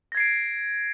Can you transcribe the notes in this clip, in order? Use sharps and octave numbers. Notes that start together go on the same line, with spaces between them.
G#6 A#6 C7 D7